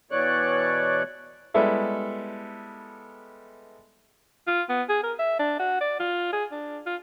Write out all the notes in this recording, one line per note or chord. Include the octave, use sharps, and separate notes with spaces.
B2 E3 C#5 D5 F#6
G3 G#3 B3 E4 A4 E5
F4
B3
G#4
A#4
E5
D4
F#4
D5
F4
G#4
D4
F4